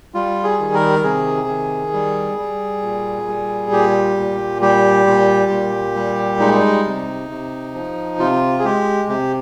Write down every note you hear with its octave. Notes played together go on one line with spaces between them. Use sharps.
G3 F4
G#4
D#3
A#4
C3 G#4
D#3
G3
G3
A#2
G3
A#2 G4
A#2
G3 G4
A#2
A#2
G3
G#3 D#4
C3
C3
F3
C3 F4
G#4
G#3 G4
C3 G4